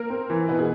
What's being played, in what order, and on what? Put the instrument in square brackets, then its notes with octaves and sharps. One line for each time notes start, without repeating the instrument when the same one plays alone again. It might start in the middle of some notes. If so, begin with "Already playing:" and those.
Already playing: [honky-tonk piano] A#3 A#4
[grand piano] C4
E3
[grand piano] B2 [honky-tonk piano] B3 B4
[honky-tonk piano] G#4